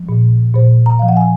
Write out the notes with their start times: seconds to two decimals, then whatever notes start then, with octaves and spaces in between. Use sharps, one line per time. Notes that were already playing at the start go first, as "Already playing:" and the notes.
Already playing: F3
0.09 A#2
0.54 A#2 C5
0.86 A#5
0.99 F3 F5
1.08 F#5
1.17 G#5